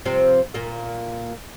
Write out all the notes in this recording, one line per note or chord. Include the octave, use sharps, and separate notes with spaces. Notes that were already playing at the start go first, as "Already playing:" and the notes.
C3 F3 C4
A#2 A#3